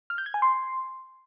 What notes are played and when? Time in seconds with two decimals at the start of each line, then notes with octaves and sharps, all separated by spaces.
0.10 F6
0.18 G6
0.26 G#6
0.34 G#5
0.42 C6